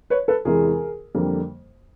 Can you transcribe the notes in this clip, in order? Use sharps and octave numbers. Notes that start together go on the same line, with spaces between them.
B4 C#5
A4 B4
E2 C3 E3 G#3 G#4 A#4
F2 D3 G3 A#3